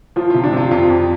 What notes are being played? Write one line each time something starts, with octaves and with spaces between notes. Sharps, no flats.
F3 F4
F4
C3
D4
C3 F4
F2 F4
F2